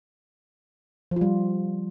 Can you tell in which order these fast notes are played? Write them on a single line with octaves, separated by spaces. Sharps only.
F3 F4 G3